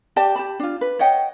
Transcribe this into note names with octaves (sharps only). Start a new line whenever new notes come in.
G4 D5 G5 A5
G4 A5 B5
D4 F4
B4
C#5 D#5 F#5 G5